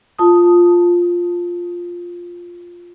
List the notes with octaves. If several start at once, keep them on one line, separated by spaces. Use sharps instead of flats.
F4 A5 D#6